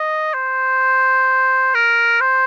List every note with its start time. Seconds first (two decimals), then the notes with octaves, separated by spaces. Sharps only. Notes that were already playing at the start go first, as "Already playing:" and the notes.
Already playing: D#5
0.34 C5
1.74 A#4
2.20 C5